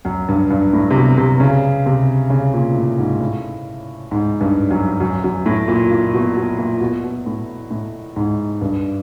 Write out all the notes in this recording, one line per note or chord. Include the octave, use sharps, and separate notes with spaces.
F#2
G2
G2
A2
C3
B2
C3
C#3
C3
C#3
A#2
A2
G#2
A2
G#2
G2
F#2
F#2
F#2
A2
A#2
A#2
B2
B2
A#2
B2
B2
A2
A2
G#2
G2